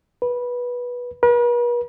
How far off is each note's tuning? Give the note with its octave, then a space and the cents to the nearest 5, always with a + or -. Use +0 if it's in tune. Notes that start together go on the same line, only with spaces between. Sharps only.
B4 -15
B4 -45